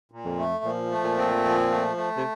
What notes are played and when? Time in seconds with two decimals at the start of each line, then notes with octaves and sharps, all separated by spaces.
0.12 A#2
0.25 F2
0.38 A3
0.64 A#2 F3
0.91 A3
1.04 A#2
1.18 C4
1.44 F3
1.71 A3
1.97 A3
2.17 C3